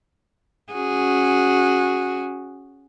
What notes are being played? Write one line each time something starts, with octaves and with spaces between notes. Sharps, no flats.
C#4 F#4 G#4